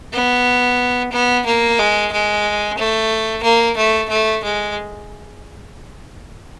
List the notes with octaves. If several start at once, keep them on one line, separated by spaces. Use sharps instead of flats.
B3
B3
A#3
G#3
G#3
A3
A#3
A3
A3
G#3